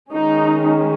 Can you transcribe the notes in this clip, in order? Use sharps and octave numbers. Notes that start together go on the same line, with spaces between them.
D#3 G#3 C#4 D#4